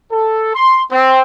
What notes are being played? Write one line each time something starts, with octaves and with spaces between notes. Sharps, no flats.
A4
C6
C4